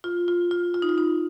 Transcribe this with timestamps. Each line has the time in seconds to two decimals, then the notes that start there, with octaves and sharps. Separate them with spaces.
0.04 F4
0.28 F4
0.51 F4
0.74 F4
0.82 D#4
0.89 F4
0.98 D#4